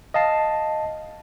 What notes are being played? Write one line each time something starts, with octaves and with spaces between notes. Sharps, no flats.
D#5 F5 A5 C7